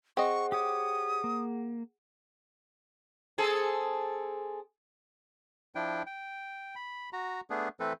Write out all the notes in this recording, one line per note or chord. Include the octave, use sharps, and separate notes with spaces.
C4 G#4 D#5 F#5 C#6
G4 C#5 D6 D#6
A#3
C4 G#4 A4
F3 D4 E4 G5
G5
B5
F#4 A#5
A3 B3 D4 G#4
E3 A3 C4 A4 B4